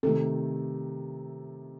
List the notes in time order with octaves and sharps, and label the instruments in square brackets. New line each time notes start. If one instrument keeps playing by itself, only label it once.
[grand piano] C3 D#3 A3 [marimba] A4